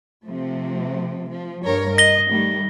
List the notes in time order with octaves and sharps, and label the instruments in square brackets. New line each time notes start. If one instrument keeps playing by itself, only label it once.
[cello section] C3 F3 A3
F3
G2 A#4 C#5
[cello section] D#5 [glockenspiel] A#6 G7
[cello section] D#3 G3 A3